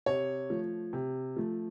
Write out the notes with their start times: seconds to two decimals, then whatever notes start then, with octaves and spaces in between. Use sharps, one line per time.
0.06 C3 C#5
0.50 F3 A3
0.93 C3
1.36 F3 A3